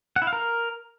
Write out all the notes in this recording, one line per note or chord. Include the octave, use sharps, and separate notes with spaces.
F#5
E4
F5
A#4